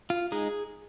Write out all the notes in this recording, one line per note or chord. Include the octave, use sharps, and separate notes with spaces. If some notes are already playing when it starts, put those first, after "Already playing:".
F4
G#3 D#4 G#4